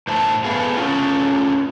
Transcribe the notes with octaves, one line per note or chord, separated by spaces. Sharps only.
A2 C5 E5 A5
A3 B3 G#4 F5
A3 C#4 F4